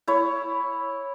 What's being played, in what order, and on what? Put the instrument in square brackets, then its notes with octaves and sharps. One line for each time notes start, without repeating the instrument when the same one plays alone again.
[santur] E4 C#5